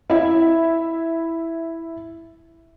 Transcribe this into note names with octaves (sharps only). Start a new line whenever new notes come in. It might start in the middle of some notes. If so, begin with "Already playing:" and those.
E4 E5